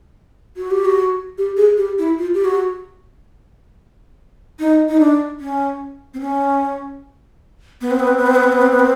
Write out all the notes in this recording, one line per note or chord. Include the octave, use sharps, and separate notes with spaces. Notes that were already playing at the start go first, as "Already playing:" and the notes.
F#4
G4
F#4
G4
G#4
G4
E4
F4
G4
F#4
D#4
D#4
D4
C#4
C4
C#4
B3
C4
B3
C4
B3
C4
B3
C4
B3
C4
B3
C4